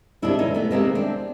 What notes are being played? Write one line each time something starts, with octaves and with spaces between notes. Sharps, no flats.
C3 D#3 G#3 D4 E4
C#4 D#4
A3 B3
C3 D#3 G#3 A#3 C4
C4 D4